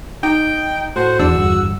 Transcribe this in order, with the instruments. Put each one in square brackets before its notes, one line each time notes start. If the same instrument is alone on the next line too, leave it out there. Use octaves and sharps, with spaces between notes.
[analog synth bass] D#4 [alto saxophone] G5
[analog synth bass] A2 [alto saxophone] F#4 [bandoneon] C5
[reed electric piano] E2 [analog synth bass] D4 [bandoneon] E6
[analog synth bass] G1